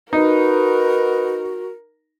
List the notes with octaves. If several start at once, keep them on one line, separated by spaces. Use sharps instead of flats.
D#4 F#4 A#4 B4